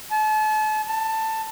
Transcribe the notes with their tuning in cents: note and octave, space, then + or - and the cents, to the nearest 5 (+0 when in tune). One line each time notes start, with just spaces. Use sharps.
A5 -35
A5 +15